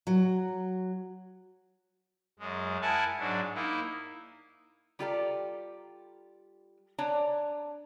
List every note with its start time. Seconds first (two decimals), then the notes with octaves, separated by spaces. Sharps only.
0.07 F#3
2.39 F#2 G#3
2.82 E4 A#4 F#5 G#5 A5
3.19 G#2 F#3 D4
3.54 A#3 D#4 E4
4.99 G3 F4 G4 A4 D5 A#5
6.98 D4 C#5 D5 G#5 A#5